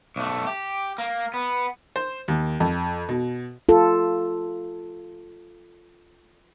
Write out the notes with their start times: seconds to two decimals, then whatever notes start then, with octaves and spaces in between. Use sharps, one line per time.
0.16 B1 A3
0.47 G4
0.98 A#3
1.34 B3
1.96 C5
2.28 D#2
2.60 F2
3.09 B2
3.69 F4 A4